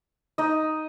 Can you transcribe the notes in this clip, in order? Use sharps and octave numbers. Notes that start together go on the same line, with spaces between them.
D#4 D#5